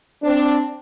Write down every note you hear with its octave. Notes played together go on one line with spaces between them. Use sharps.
C4 D4